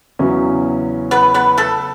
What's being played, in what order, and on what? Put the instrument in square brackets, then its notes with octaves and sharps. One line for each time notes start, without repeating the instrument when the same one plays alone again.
[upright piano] E2 C#3 F#3 C#4 E4
[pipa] B3 B4
B3 B4
A3 A4